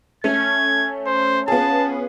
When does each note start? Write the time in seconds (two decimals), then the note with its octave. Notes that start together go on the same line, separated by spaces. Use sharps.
0.24 A3 C#4 G#6
1.06 C5
1.48 B3 F4 G#4 A5